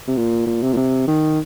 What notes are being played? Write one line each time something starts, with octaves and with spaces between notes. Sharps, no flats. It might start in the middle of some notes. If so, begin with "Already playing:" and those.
C3
A#2
A#2
C3
A#2
C3
D#3